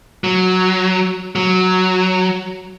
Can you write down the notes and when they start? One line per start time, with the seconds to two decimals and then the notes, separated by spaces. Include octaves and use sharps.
0.24 F#3
1.35 F#3